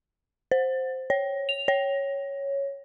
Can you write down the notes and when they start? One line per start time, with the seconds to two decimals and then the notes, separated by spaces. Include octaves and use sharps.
0.51 C5
1.10 C#5
1.49 F7
1.68 C#5